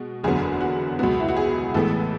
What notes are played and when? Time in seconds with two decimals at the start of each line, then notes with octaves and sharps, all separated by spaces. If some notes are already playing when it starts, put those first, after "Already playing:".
Already playing: B2 G#3
0.24 F#1 E2 D3 F#3 B3 G#4
0.61 F#4
0.99 C#2 B2 F#3 B3 F#4
1.20 E4
1.29 F#4
1.37 G#4
1.74 A1 A2 E3 G#3 B3 A4